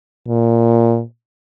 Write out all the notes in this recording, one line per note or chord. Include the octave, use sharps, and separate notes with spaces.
A#2